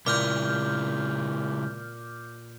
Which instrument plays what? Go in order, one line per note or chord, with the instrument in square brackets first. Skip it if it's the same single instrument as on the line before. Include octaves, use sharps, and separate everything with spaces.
[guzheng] A#2 [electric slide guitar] C#3 G#3 E4 [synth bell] D6 F6 G6